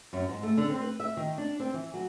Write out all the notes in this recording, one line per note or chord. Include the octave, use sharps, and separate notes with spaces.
F#2
G#2
A3
D3
C4
B4
E5
D#3
D4
C4
E3
F#3